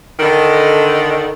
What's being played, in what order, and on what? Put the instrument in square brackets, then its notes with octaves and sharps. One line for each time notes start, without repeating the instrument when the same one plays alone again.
[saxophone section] D3 D#3